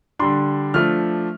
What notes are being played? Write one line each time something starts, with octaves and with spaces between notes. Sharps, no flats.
D3 G3 D4 C6
F3 A3 D4 F6